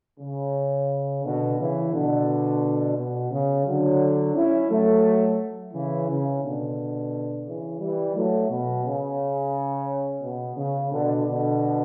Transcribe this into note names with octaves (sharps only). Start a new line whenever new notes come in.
C#3
B2 D3
C#3 E3
B2 D3
B2
C#3
D3 F#3
C#4 E4
F#3 A3
C#3 E3
C#3
B2 D3
C#3 E3
E3 G3
F#3 A3
B2
C#3
B2
C#3
B2 D3
B2 D3